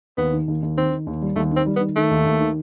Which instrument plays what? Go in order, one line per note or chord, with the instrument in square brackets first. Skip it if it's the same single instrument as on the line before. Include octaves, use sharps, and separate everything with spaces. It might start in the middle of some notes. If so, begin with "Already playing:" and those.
[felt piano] D#2 [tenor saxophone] B3
[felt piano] D#3
D#2
D#2
[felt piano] D#3 [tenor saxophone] C4
[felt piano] D#3
D#2
G3
[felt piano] D#2 [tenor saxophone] A3
[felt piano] D#3
[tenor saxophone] C4
[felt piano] G3
[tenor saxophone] B3
[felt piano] D#3
[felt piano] D#3 [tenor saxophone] A3
[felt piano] D#2
D#2
D#3